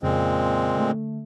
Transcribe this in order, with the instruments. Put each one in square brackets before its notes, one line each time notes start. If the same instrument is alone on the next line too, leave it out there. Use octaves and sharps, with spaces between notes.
[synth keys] F2 C#3 [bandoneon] A#2 G#3 C4
[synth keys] D3 A3